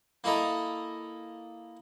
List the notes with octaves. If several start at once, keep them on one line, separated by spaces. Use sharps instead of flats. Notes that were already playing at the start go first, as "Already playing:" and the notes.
A#3 E4 A4 D#5 A#5